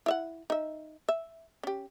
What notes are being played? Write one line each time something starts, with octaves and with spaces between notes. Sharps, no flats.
E4 E5 F#5
D#4 E5
E5
C#4 G4